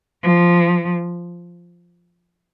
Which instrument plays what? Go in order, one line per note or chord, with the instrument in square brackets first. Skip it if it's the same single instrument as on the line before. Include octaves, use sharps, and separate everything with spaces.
[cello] F3